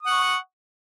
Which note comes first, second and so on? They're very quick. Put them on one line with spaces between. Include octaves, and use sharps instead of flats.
D#6 F#5 C#6